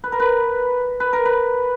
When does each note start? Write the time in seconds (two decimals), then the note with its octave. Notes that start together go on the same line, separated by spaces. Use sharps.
0.04 B4
0.12 A#4
0.20 B4
1.00 B4
1.13 A#4
1.25 B4